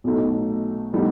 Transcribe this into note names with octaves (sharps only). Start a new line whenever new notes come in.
B1 B2 A3 D#4
A2 G3 B3 D#4